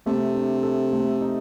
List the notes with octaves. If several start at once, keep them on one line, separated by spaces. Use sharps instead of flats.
C3 A3
D4
A4
A3
D#4